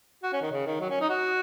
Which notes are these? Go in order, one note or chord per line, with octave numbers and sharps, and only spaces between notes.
F#4
C#4
D#3
C#3
D#3
F#3
C#4
D#4
F#4